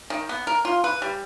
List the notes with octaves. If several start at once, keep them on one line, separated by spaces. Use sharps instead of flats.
D#3
B3
A#4
F4
B4
G3